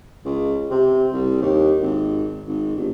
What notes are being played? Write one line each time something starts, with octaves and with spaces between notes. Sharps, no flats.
C#2
C3
C2
D#2
G#1
G#1
G1